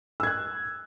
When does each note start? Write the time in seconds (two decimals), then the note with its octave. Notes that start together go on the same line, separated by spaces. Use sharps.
0.20 E6
0.23 G#6
0.27 F#6